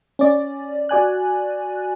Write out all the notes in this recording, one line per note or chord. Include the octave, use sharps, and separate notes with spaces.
C#4 D5
F#4 D5 G#5 F#6